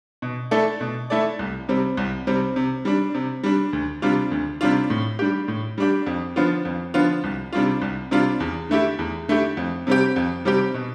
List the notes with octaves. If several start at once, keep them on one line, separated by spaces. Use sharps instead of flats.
B2
A3 E4 A4 D5
B2
A3 E4 A4 D5
C2
C3 G3 C4
C2
C3 G3 C4
C3
G3 D4
C3
G3 D4
D2
C3 G3 D4 F4
D2
C3 G3 D4 F4
A2
G3 D4 G4
A2
G3 D4 G4
F2
D3 F3 B3 F4
F2
D3 F3 B3 F4
C2
C3 G3 D4 F4
C2
C3 G3 D4 F4
E2
D3 A3 E4 G4
E2
D3 A3 E4 G4
F2
C3 G3 C4 G4
F2
C3 G3 C4 G4
B2